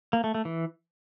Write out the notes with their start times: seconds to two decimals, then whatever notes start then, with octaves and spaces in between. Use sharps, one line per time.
0.13 A#3
0.24 A3
0.35 A3
0.45 E3